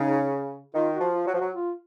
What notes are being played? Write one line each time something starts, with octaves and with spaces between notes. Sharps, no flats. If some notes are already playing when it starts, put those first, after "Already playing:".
Already playing: C#3 D#4
D#3 F4
F#4
F3
F4
F#3
F3 F#4
F#3
F4